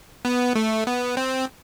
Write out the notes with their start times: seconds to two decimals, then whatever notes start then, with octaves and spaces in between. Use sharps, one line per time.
0.25 B3
0.55 A3
0.87 B3
1.17 C4